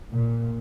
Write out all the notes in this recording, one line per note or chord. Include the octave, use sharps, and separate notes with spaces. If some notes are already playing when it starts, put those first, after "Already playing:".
A#2